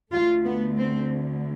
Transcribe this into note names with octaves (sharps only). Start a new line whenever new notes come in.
D2 D3 A3 F4
B3
C4